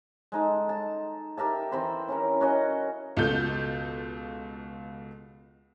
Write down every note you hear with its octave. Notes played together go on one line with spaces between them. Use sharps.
G#3 D#4 A4
A5
G4 A#4 E5 A5
E3 C4 B5 C6
C#4 E4 A#4
C#4 F#4 D#5
C#2 B2 F4 A4 G6